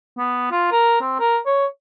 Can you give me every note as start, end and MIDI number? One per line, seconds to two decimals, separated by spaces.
0.18 0.50 59
0.51 0.71 65
0.71 1.00 70
1.01 1.18 60
1.19 1.37 70
1.46 1.66 73